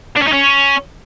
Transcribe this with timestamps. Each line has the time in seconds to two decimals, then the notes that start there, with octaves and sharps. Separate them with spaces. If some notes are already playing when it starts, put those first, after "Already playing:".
0.16 D4
0.21 C#4
0.27 D#4
0.32 C#4